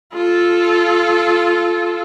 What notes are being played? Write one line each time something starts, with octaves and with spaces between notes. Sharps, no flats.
F4 A4